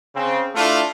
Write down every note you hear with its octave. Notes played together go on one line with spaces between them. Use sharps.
C#3 C4
A3 D4 E4 F4